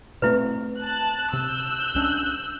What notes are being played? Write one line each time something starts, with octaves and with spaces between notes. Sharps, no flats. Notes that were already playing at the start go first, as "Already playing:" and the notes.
B2 A3 C4 E4 B4
A5 F#6
C3 E6 F#6 G6
C2 C#4 D4